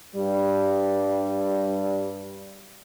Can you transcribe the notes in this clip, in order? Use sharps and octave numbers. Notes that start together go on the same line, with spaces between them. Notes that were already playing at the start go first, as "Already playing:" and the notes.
G2 G3